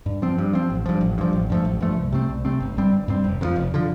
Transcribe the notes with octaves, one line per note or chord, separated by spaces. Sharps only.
G2
F3 C4
G2
F3 C4
A1
G2 F3
A1
G2 F3
A1
G2 F3 A3
A1
G2 F3 A3
C2
C3 A3 C4
C2
C3 A3 C4
G1
G2 G3 C4
G1
G2 G3 C4
F1
F2 D3 F3
F1
D3 F3